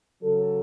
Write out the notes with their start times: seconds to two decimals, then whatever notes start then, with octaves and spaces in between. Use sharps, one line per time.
0.22 C#3 F#3 A4